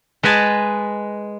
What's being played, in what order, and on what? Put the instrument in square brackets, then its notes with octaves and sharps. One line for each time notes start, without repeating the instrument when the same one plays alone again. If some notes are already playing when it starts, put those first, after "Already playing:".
[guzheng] G#3 B4 D#5 G#5 A5